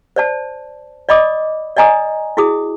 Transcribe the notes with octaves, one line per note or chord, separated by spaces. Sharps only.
C5 D5 A5
D5 D#5 B5 D6 D#6
D5 D#5 G#5 A#5 D#6
E4 F#4 G#4 D#6